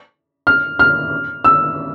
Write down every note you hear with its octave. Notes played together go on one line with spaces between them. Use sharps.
F6
F6
E6